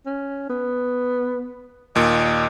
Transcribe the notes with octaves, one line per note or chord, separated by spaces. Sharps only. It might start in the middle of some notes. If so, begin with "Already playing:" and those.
C#4
B3
D#2 A#2 D#5